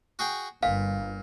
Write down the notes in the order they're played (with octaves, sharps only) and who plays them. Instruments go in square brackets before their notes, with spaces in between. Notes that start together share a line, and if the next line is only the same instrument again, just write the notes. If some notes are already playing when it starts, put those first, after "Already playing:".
[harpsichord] F#4 G#4 G5
[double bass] G1 [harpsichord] A#2 [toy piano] F5